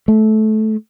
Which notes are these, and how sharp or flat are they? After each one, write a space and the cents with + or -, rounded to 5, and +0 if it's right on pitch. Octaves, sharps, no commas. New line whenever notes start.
A3 -20